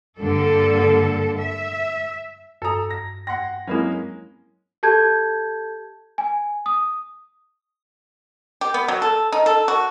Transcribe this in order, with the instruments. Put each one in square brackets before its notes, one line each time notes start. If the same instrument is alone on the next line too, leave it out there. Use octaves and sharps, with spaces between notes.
[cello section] G2 D3 A#3 A4
E5
[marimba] G2 D#6 [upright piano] A4 A#5
[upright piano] A#6
[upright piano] F#5 C6 A#6 [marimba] G5
[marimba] F#3 C4 E4 [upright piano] G#3 A#3 C#4
[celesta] G4 A4 A5 G6 G#6
G#5
D#6
[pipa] G4
B3
F#3
A4
D#4
A4
F#4